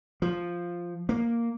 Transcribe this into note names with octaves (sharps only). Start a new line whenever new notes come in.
F3
A#3